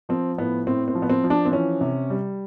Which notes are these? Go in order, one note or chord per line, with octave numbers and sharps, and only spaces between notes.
F3 C4
A2 B3
A2 C4
C4
F3
B3
C4
F3
D4
C4
E3 C#4
C3
G3